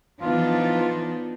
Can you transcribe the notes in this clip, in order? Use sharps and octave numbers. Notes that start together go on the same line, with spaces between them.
E3 F3 B3 D4 D#4 F4